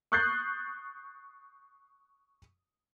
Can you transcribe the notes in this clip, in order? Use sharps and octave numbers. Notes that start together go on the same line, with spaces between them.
C#6 D#6 F#6 G6 A6 C7